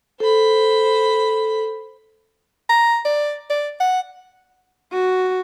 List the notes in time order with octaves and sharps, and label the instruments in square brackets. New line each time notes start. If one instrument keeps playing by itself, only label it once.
[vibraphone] A4 [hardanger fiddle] C5 B5
[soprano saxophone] A#5
D5
D5
F#5
[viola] F#4